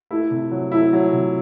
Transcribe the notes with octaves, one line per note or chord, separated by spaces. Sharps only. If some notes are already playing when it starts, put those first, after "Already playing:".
A3 E4
C3
F#3
A3 E4
F#3
C3